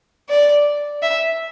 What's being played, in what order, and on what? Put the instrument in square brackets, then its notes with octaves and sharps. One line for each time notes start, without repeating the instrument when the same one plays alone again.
[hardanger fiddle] D5
E5